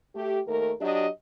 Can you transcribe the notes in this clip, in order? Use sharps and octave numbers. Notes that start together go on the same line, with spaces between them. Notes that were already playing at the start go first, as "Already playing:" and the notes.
A3 G4
D#2 A3 A#4
F#3 D4 G4 D#5